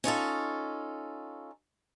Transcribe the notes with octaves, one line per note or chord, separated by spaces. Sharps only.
C#4 D#4 F4 A4